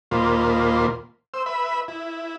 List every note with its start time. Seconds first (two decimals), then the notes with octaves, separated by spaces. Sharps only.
0.11 D#2 A#2 A#3 F4 C5 B5
1.34 C5 E6
1.46 B4 E5 B5
1.88 E4